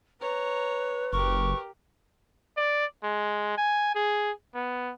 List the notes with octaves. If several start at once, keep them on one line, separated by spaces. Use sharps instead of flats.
B4 C#5 A#5
F#1 G4 A#4 C#6
D5
G#3
G#5
G#4
B3